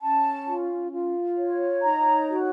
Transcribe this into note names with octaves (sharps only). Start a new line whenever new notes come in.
C#4 A5
F4
F4
C#5
D#4 A#5
F#4